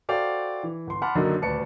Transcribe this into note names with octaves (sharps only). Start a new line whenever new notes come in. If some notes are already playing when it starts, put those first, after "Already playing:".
F#4 A4 C5 D5 F5 G5
E3
G1 C6
F#5 A5 B5 C6 D6 F6
F#2 D3 D#3 F#3 A#3 D#4
D#1 D2 B4 D5 A5 C#7